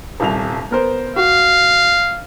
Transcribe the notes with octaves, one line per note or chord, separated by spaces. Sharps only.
D#1 C2 F7
B3 A#4 C5
F#4 F5